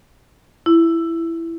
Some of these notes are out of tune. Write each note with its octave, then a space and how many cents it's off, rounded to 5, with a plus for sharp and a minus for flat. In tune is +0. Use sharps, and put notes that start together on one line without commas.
E4 +10